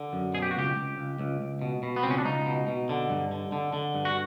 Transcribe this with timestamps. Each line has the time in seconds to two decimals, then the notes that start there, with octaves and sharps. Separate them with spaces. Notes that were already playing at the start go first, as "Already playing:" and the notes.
Already playing: D3
0.13 F#2
0.34 B2 G#4
0.42 G4
0.51 F#4
0.55 C#2 G4
0.76 C#2
0.98 C#2
1.19 C#2
1.41 C#2
1.62 B2
1.83 B2
1.96 B3
2.03 C#2 C4
2.11 C#4
2.18 D4
2.25 C#2 D#4
2.46 B2
2.68 B2
2.89 D3
3.10 G2
3.31 D3
3.52 D3
3.73 D3
3.95 G2
4.05 F#4